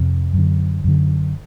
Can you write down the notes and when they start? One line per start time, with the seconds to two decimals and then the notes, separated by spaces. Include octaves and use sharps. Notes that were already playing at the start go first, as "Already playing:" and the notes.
Already playing: F2 C3
0.33 F#2 D3
0.84 F#2 D3